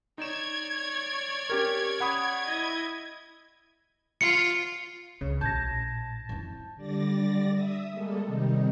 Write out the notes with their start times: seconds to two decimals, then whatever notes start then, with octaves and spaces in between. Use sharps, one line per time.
0.18 D#4 C#5 D5 G#6 E7
1.50 C#4 G4 A#4
2.00 F#5 B5 D#6
2.45 E4 D#5
4.21 F4 C#7
5.21 C#2 C#3
5.41 A#1 A2 A5 G6 G#6 A#6
6.29 F2 E4
6.75 D3 G3 D5 A6 A#6
7.52 E5 D#6
7.91 G3 G#3 A#3 A4
8.24 C3 D#3 G3 D#4